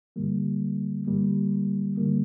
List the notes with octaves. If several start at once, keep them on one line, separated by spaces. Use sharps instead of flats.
G2 D3 G3 A#3
G2 D3 G3 A#3
D3 G3 A#3